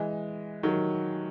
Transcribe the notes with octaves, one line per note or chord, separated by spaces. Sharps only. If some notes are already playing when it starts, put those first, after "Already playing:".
Already playing: E3 G#3
D#3 F#3